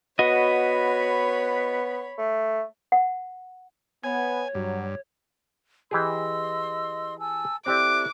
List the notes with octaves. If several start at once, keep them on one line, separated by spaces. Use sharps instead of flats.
B3 F#4 C#5 D#5 B5
A3
F#5
B3 C#5 G#5
G2 F#3
E3 G4 G#4 D#5 C6 E6
G#5 A5 E6
C4 E4 G4 A4 D5 D6 F#6